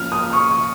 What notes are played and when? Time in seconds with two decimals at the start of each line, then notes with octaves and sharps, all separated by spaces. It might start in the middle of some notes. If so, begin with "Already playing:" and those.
Already playing: F3 A#3 C#4 F6
0.12 D#6
0.33 C#6